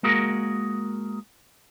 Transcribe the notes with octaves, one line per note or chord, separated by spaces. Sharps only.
G#3 A#3 F#4 G#4 A#4